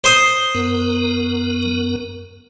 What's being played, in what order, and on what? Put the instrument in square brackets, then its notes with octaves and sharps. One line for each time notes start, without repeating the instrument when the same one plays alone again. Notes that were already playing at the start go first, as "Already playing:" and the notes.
[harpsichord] C5 C6 D#6
[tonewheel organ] F#2 B3 A#4